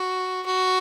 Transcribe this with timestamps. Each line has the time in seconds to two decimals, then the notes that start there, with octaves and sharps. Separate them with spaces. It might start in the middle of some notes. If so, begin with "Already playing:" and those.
Already playing: F#4
0.46 F#4